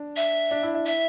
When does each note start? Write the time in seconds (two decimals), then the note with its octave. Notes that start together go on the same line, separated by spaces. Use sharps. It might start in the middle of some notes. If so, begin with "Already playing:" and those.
Already playing: D4
0.16 E5
0.51 D4
0.63 E4
0.74 E4
0.86 E5